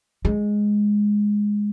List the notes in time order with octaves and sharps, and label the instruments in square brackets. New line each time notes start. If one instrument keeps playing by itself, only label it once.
[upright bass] G#3